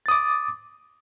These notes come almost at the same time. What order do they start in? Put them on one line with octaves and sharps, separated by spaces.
A6 D#6 D6